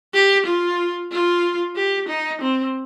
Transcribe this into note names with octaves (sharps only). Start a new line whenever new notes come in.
G4
F4
F4
G4
D#4
C4